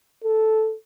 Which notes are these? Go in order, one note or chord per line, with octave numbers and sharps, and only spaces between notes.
A4